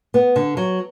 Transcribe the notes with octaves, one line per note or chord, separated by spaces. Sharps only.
B3
D3
F#3